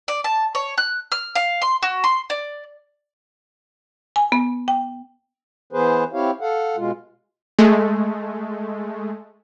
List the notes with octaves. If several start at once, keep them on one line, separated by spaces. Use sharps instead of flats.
D5
A5
C#5
F#6
F6
F5
C6
F#4
C6
D5
G#5
B3
G5
E3 B3 G#4 B4 C5
C4 E4 G4 C#5 F5
A4 F5 F#5
B2 G#3 F4
G#3 A3